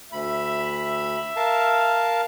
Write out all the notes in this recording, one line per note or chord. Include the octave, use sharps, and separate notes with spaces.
D2 E5 B5
A#4 F5 A5